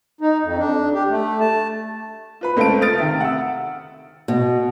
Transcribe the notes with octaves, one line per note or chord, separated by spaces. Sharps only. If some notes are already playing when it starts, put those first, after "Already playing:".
D#4
F2
D4
G4
A3
A5
F4 B4 B5
C#2 A3 C5 F5 A5 D7
D#6 F6 A6 D7
C3 D#3 E5
F#5 E6
B2